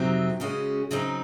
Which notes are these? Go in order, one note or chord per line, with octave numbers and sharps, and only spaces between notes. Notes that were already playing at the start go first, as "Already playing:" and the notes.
Already playing: F2 C3 F#3 C4 D#4
C#3 G#3 C#4 F#4
C#3 F#3 C4 D#4